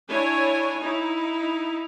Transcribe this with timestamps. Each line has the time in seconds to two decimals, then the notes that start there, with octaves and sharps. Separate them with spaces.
0.11 D4 E4 C#5 G#5
0.82 D#4 E4